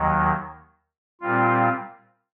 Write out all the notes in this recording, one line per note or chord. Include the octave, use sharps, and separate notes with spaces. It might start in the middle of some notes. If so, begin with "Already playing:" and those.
Already playing: D#2 D#3 F#3
A#2 G3 C4 F4